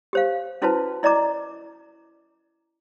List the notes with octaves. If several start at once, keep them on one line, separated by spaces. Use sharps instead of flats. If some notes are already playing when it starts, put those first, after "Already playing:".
G4 C5 F5
C#4 E4 F#4 B4 C5 A5
E4 D5 D#5 A#5 D6